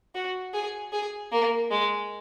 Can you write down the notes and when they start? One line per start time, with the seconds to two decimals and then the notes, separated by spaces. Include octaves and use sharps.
0.15 F#4
0.54 G#4
0.93 G#4
1.32 A#3
1.71 G#3